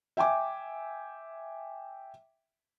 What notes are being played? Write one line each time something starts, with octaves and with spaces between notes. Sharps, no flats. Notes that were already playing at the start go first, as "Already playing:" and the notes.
E5 G5 G#5 D6